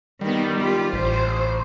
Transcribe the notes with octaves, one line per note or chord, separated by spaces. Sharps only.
D#3 G3 B3
F4 G4
A1 C5